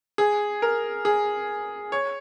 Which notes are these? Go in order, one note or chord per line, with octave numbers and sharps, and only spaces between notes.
G#4
A#4
G#4
C#5